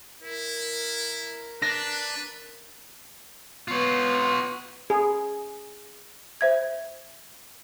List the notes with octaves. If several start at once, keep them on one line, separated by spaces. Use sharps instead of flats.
E4 A#4
D4 B4 A#6
B3 F4 C#5
G#4
C5 E5 G#6